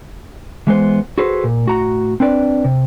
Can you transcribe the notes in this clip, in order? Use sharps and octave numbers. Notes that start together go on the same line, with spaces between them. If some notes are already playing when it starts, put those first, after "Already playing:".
E3 G#3 B3 C5
F#4 G#4 A4 B4 C5
A#2
A2 F#4 A#5
C4 D4 B4 D5
C3